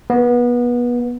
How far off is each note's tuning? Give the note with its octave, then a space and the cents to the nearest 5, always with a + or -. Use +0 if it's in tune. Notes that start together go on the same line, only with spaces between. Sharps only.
B3 -25